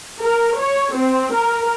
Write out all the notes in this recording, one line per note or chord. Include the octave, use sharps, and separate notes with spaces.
A#4
C#5
C4
A#4